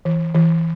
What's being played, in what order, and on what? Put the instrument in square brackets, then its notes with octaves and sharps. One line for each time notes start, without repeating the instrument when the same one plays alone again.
[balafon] E3
E3